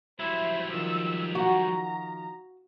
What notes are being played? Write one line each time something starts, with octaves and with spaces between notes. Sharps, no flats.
F#3 G3 E4 C5 E5
D#3 F3 E6
F#4 A#5